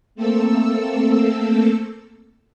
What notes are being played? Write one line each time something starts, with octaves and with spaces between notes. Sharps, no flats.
A3 A#3 C4 A4 E6